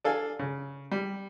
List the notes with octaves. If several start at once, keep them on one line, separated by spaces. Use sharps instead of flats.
D4 A4 F5 G#5
C#3
G3